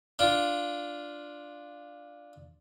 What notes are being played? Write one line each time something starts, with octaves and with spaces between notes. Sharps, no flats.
D4 F4